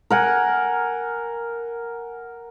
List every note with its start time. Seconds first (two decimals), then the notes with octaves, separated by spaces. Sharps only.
0.10 A#4 F#5 G#5